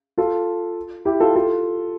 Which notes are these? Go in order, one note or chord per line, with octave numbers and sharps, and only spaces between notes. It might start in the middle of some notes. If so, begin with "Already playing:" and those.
F4 A4
E4 G4
F4 A4
F4 A4